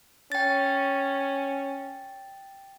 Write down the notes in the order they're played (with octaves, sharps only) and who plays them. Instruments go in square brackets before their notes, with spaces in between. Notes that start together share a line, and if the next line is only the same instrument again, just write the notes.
[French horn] C#4 [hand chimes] G5 A6